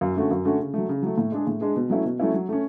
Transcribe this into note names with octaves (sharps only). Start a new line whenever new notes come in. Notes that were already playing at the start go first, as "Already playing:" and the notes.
F#2
D3 A3 C#4 F#4
F#2
D3 A3 C#4 F#4
C#3
F#3 A3
C#3
F#3 A3
A2
G#3 D4 G#4
A2
G#3 D4 G#4
B2
F#3 A3 C#4 E4
B2
F#3 A3 C#4 E4
F#3
A3 C#4